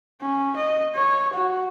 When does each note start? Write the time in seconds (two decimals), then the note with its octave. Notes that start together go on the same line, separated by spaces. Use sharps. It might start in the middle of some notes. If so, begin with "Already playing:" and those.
0.21 C#4
0.56 D#5
0.95 C#5
1.33 F#4